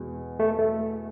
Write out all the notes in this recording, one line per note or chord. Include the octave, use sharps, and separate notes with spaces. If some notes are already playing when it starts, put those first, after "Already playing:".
Already playing: E2 B2 G#3
A3
A3